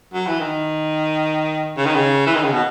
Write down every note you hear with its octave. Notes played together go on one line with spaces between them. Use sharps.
F#3
E3
D#3
C#3
D#3
C#3
E3
D#3
C#3
B2